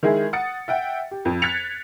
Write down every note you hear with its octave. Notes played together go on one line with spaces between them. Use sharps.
D#3 G#3 E4 G#4
F#5 D#6 A6 C#7
E5 F#5 G5
G4
F2
F#6 G#6 A6 B6 C#7 F7